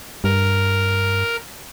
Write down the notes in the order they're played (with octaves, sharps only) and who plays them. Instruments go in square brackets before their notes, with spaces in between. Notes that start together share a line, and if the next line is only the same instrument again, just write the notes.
[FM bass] G2 [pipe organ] A#4